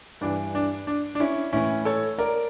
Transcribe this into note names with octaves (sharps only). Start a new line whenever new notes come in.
G2 E3 D4
D4
D4
D4
C#4 E4
A2 E3 C#4 E4
A4 C#5
A#4 D5